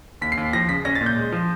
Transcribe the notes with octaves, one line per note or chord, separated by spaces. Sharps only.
D#2 B6
C7
D#2
F3 A#6
C#3 B6
C#4 A#6
A6
A#2
G6
G#3
F3